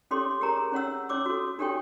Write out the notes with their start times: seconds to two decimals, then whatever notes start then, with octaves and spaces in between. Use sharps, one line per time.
0.11 C#4 G4 A4 C#5 C6 D6
0.41 G4 G#4 A#4 C#5 A#5
0.72 C#4 C#5 F#5 E6
1.09 C#4 C#5 D6 E6
1.26 F#4 A4
1.59 D4 G4 A4 C#5 G5 C#6